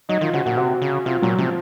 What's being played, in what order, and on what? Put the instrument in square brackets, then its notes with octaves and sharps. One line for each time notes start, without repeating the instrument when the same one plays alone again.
[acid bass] F#3 [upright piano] D#4
[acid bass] D#3 [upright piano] F4
[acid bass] C#3 [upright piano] F#4
[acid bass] A#2 [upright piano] F#4
[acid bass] C3 [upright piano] F#4
[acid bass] C#3
[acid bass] C3 [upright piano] F4
[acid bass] A#2 [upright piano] F#3
[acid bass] C3 [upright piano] F3